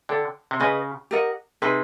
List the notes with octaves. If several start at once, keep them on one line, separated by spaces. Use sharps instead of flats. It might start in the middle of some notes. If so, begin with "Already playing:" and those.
D3 A4 D5 G5
C3
C#3 G#4 B4 D#5
G4 A#4 D#5 F#5
C3 D#4 G#4 B4